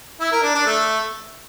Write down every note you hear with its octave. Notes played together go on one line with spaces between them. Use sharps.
E4
A#4
D4
D4
A3